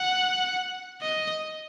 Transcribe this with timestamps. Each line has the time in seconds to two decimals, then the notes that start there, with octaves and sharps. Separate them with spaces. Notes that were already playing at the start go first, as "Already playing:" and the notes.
Already playing: F#5
1.02 D#5